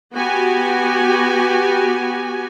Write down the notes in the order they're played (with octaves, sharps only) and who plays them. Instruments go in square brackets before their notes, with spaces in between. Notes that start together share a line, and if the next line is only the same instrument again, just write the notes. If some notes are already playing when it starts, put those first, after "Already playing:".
[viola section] B3 F#4 G4 G#5